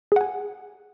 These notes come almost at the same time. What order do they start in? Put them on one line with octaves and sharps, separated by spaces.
G#4 F#5 G#5